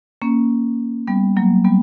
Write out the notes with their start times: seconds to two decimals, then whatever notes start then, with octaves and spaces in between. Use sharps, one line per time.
0.22 A#3 C#4
1.08 G3 B3
1.36 F#3 A#3
1.65 G3 B3